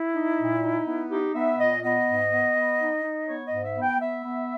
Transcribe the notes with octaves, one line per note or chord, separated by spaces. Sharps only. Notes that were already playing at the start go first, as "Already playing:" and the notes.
Already playing: E4
D#4
A#2
D#4
B3
D#4 G4
B3 E5
A#2 D#5
B3 D#5
G#2
B3
B3
D#4
D#4
B3 C#5
D#5
G#2
E5
B3
G5
B3 E5
B3